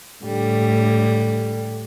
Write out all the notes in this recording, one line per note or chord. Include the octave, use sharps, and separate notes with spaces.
A2 D3 G3